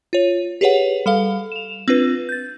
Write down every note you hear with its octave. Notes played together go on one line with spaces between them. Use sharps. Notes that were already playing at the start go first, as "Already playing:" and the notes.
F4 C#5
G4 G#4 B4 C#5 F#5
G3 A4 F5
E7 F7
C4 D4 F4 B4
G6 A6